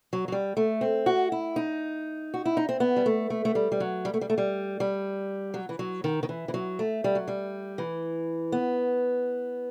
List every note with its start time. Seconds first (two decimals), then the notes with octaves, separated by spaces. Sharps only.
0.13 F#3
0.28 F#3
0.32 G3
0.57 A3
0.81 C4
1.06 F#4
1.32 E4
1.56 D#4
2.34 F#4
2.45 E4
2.57 D#4
2.69 C4
2.80 B3
2.96 G3
3.06 A3
3.30 A3
3.45 A3
3.55 G3
3.72 G3
3.80 F#3
4.05 G3
4.14 A3
4.21 G3
4.30 A3
4.38 G3
4.80 G3
5.54 F#3
5.69 E3
5.79 F#3
6.04 D#3
6.23 D#3
6.29 E3
6.48 E3
6.54 F#3
6.79 A3
7.04 G3
7.15 F#3
7.28 G3
7.78 E3
8.52 B3